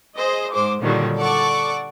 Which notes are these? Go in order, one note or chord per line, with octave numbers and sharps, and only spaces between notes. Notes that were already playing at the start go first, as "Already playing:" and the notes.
G#4 C5 D#5
G#2 G#3 C5 D6
A#2 D3 D#3 F#3 G3
A4 D5 F#5 C#6 D6